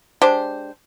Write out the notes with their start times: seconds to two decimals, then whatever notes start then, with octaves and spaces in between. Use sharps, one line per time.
0.22 G#3 D4 G4 C5